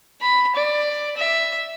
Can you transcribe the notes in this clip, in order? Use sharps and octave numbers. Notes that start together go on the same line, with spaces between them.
B5
D5
E5